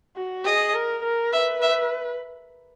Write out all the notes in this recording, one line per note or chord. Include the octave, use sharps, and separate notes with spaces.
F#4
G#4 D#5
A#4
A#4
B4 E5
E5